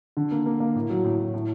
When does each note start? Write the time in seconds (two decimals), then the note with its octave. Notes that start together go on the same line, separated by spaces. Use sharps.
0.17 D3
0.31 A#3
0.46 A#3
0.60 A#3
0.75 A2
0.90 F#3
1.04 A2
1.19 A2
1.34 A2